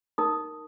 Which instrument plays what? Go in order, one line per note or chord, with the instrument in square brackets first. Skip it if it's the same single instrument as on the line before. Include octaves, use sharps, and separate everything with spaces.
[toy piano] D#4 A#4 D#6